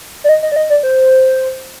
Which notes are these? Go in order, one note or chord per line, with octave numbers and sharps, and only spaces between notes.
D5
D#5
D#5
D5
D#5
D5
C5